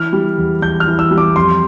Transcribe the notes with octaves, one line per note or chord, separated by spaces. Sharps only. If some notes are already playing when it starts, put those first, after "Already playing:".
Already playing: E3 F6
G3
E2
E2 G6
F6
E3
E6
G3
D6
F2 C6